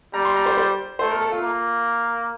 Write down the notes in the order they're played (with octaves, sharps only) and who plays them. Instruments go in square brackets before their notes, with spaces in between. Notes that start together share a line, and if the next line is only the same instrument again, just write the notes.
[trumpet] G3 [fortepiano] A#5
[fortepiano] C6
A#5
C5
C5
[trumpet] A3 [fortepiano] C5
[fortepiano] A#4
A4
F4
[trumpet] A#3